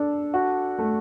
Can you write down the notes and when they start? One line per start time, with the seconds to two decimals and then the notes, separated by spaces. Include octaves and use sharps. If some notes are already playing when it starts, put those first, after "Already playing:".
Already playing: D4 A4
0.34 F#4
0.79 A3